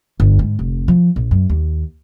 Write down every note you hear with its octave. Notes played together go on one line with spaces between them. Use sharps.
G1
G#2
F1
F3
A#1
F#2
D#2